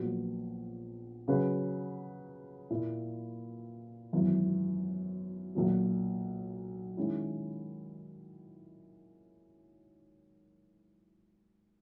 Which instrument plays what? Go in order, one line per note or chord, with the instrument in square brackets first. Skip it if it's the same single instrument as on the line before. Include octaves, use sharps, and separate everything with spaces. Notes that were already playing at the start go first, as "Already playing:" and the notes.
Already playing: [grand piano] A#1 A#2 F#3 B3 F#4
C#3 F#3 C#4 F#4 B4
A#2 A#3 E4
G#1 F#2 E3 B3
B1 A#2 F#3
D#3 G#3 C#4 E4